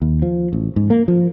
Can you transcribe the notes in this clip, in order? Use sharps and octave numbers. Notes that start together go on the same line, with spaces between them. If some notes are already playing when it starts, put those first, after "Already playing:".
D#2
F3
A1
G#2
A#3
F3